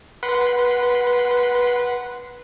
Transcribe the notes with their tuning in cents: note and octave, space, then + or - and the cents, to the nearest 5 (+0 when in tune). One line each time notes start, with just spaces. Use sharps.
B4 -20 F#5 +0 C6 -20